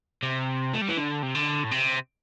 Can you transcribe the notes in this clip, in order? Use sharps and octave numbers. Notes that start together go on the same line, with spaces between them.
C3
A3
G3
E3
D3
C3
D3
A2
C3